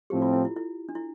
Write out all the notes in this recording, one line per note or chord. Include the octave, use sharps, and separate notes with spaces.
A2 F3 C4 G4
F4
E4
E4
E4
D4
E4